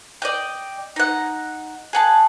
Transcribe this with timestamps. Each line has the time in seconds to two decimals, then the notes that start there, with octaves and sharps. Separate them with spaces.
0.22 D5 D#5 G5
0.96 D#4 F#5
1.93 G#4 F#5 A5